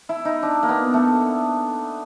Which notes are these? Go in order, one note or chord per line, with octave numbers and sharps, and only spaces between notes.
E4
D#4
D4
A#3
B3
A3